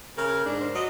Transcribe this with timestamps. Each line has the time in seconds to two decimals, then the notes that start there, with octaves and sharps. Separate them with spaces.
0.18 C#3 A#4
0.46 G#2 D4
0.61 C5
0.75 F#3 D#5